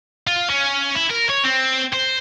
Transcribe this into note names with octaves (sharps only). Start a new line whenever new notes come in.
F4
C#4
E4
A#4
C#5
C4
C5